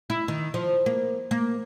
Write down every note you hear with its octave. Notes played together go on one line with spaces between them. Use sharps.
E4
D#3
F3
A#3
A#3